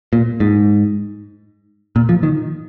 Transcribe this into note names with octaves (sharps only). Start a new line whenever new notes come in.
A#2
G#2
A#2
F3
D#3